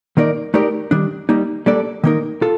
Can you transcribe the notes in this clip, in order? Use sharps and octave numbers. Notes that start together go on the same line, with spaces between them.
D#3 A#3 D#4 A#4 D5
A3 D#4 G4 A#4 D5
D#3 G3 D4
G3 A#3 D#4
G3 A#3 D4 A4 D5
D#3 A#3 D#4 A#4
F4 A4